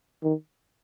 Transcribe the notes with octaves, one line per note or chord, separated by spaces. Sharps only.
D#3